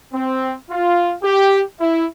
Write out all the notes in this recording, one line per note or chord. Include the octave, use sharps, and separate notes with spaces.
C4
F4
G4
E4